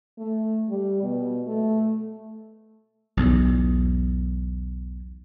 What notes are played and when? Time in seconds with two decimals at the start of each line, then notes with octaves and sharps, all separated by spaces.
0.18 A3
0.70 G3
1.03 B2
1.47 A3
3.17 B1 E2